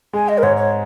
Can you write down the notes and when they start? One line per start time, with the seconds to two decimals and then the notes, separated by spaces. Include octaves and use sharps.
0.13 G#3 G#5
0.28 D#5
0.38 A#4
0.43 G#2 C#5
0.57 C#5